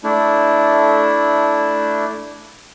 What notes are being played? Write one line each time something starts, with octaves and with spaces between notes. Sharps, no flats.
A3 D4 E4